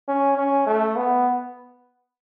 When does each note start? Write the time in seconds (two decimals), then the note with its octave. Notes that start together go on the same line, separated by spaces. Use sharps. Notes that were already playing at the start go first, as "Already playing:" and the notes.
0.08 C#4
0.38 C#4
0.67 A3
0.96 B3